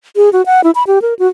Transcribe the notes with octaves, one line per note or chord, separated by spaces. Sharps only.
G#4
F#4
F#5
E4
B5
G4
A#4
F#4